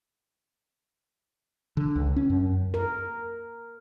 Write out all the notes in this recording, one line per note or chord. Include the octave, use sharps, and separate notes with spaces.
D3
C#2
C#4
F#2
A#4